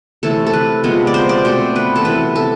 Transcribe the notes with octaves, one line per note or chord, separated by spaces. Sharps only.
C3 E3 A3 A4
A4
B4
C3 F3 G#3 B3
D5
C5
D5
B2 A3 C4 C5
B4
A4
C3 E3 B3 B4
A4